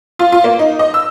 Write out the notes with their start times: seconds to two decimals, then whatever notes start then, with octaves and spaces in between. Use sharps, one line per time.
0.19 F4
0.32 F4
0.44 A#3
0.59 D#4
0.79 D#5
0.94 E6